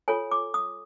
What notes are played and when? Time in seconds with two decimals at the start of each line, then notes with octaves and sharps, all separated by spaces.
0.08 F4 A4 C#5 G#5
0.31 D6
0.54 D#6